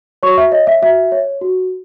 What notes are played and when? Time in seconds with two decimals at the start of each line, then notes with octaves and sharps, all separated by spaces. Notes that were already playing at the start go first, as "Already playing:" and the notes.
0.23 F#4 C#5 C#6
0.38 E5
0.52 C#5 D#5
0.67 E5
0.82 F#4 E5
1.12 C#5
1.41 F#4